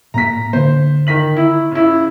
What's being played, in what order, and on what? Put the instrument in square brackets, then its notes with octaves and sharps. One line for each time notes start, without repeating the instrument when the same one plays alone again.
[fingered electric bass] A2 A#3 [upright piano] A#5 B6
[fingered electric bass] D3 A#3 [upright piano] C5
[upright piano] D#3 B6 F#7
E4
C#3 E4